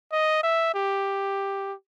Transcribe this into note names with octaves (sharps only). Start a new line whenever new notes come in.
D#5
E5
G4